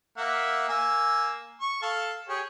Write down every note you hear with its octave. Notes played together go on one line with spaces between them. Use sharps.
A#3 E5 F#5
A#3 G#5 E6
C#6
A4 F5 A5
G4 G#4 C#5